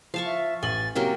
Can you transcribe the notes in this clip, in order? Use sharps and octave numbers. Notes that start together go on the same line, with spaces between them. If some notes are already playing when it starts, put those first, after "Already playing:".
F3 F5 A5 C#6
E5
A1 G#5 A6 F#7
C3 F#3 A#3 C#4 G4 A#4